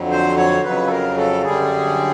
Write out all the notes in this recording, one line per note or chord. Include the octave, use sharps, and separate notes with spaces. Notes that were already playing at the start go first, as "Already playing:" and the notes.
Already playing: F2 D3 F#3
C5
C#5
F2 C#3 F#3 B4
A4
A#4
A4
F#2 D3 G3 G#4